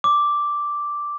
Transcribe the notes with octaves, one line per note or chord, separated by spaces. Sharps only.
D6